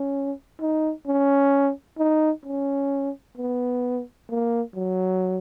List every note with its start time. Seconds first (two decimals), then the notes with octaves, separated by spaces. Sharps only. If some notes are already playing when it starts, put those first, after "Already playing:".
Already playing: C#4
0.60 D#4
1.07 C#4
1.99 D#4
2.45 C#4
3.37 B3
4.30 A#3
4.75 F#3